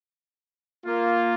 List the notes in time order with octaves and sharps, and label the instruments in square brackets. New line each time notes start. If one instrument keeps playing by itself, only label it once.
[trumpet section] A#3 F4